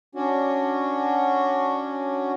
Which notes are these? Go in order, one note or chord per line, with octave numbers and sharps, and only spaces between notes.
C#4 D4 F#4